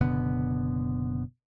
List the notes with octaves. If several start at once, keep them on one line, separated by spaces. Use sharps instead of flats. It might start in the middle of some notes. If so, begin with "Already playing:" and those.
F#1 B2 D3 B3